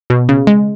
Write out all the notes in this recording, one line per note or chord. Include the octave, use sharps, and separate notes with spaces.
B2
C#3
G#3